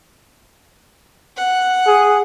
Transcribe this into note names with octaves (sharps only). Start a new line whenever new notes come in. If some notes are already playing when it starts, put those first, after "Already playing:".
F#5
G#4